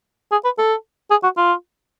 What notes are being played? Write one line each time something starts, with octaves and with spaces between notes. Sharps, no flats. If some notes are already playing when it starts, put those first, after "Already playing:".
G#4
B4
A4
G#4
F#4
F4